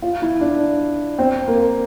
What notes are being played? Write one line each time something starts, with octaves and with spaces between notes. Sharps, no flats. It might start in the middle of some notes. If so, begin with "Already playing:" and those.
F4
E4
D4
C4
A#3